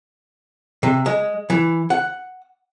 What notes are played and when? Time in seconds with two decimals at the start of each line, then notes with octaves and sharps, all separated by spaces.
0.83 C3
1.06 G#3
1.50 E3
1.90 F#5